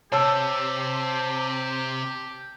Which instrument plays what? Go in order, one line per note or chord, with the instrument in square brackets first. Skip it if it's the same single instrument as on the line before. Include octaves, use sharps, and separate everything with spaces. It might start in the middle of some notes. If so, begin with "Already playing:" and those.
[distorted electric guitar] C3 [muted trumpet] G4 [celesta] C#5 [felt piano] A5 E6